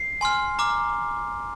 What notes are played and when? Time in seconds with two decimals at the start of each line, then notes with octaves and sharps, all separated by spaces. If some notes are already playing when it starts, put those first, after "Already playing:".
Already playing: C7
0.21 G#5 C6 F6
0.59 A#5 D6 F6